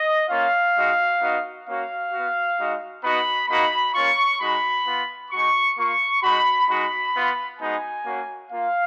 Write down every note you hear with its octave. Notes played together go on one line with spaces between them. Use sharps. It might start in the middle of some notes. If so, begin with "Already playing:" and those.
Already playing: D#5
A#3 C#4 F4 F5
G#3 D#4 F#4
B3 D#4 F#4
A#3 C#4 F#4 F5
B3 F#4
G#3 D#4 F#4
B3 D#4 F#4 B5
A#3 D#4 F#4 B5
A#3 C#4 F4 C#6
G#3 D#4 F#4 B5
B3 F4
G#3 D#4 F#4 C#6
A#3 F4 C#6
G#3 D#4 F#4 B5
G#3 D#4 F#4 B5
B3 F4
G#3 B3 D#4 F#4 G#5
A#3 C#4 F#4
A#3 F4 F5